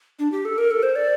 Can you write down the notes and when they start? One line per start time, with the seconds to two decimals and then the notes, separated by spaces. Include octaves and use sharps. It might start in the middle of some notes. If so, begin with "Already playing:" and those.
0.19 D4
0.32 G4
0.45 A4
0.58 A#4
0.71 A4
0.83 C5
0.96 D5